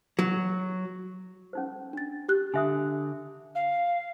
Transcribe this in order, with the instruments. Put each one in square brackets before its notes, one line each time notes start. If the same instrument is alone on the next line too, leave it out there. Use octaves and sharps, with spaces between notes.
[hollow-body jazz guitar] F#3
[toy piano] C#4 D#4 C5
[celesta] D4 A6
G4 F#6
[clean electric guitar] D3 [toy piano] D4 E5 D#6
[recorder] F5